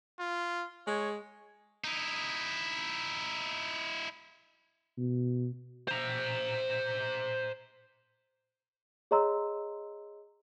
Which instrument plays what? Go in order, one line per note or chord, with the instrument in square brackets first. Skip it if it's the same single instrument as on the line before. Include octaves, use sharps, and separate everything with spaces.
[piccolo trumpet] F4
[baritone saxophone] G#3 [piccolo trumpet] C#5
[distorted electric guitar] D#4 E4
[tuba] B2
[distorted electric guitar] C5 A#5
[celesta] G#4 C#5 D#5 A#5 C6 E6